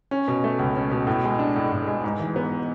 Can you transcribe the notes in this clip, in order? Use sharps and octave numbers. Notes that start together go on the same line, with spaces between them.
C#4
B2
A3
C#2
C#4
B2
A2
G#3
D4
A2
A2
G#3
G#2
E3
B3